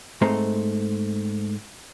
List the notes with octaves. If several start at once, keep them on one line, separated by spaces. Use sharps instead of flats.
G#2 A3 C4 C5 A#5